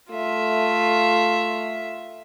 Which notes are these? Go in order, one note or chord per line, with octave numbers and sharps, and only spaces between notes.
A3 F4 E5